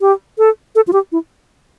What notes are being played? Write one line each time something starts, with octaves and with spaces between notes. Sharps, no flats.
G4
A4
A4
F4
G4
E4